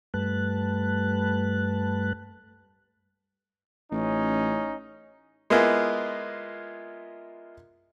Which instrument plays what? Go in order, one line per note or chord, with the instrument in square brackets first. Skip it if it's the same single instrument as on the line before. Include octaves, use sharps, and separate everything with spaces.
[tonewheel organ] G2 G3 A3 B4 A5 F#6
[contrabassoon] A1 [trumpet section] C#4 D#4
[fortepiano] G#3 A#3 B3 E4 F4 G#4